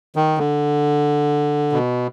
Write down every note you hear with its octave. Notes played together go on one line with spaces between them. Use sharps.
D#3
D3
B2